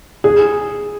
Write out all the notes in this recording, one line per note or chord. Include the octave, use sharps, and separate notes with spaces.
G#4